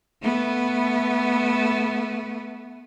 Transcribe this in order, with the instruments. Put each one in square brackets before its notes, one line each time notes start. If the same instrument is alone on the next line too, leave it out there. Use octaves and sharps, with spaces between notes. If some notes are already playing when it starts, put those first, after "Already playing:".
[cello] A3 B3